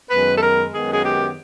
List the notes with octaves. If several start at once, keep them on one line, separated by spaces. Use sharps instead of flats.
F#2 D#3 G#3 B3 B4
A4
A#4
F#2 D#3 G#3 B3 G#4
G#4
G4